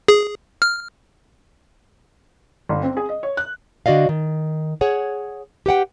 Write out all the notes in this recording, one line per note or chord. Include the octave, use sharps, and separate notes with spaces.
G#4
F6
G1
C4
G#4
D#5
C#5
F#6
D3 F#4 D5 D#5 F5
D#3
G#4 C#5 F#5
G4 B4 F#5 G5